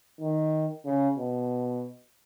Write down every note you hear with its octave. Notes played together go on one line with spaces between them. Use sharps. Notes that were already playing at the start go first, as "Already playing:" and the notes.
D#3
C#3
B2